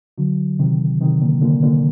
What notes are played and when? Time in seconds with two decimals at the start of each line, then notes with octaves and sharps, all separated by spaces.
0.18 D3 F#3
0.59 C3 D#3
1.01 C3 D#3
1.21 A#2 D3
1.41 A#2 D3
1.63 A#2 D3